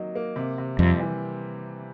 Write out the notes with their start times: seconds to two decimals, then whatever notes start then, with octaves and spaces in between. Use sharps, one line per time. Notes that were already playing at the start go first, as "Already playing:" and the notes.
Already playing: F#3 A#3 D#4 F#4
0.15 A#3
0.36 C3
0.58 C3
0.79 F2 G3
0.99 E3